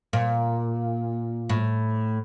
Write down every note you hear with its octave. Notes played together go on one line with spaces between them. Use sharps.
A#2
A2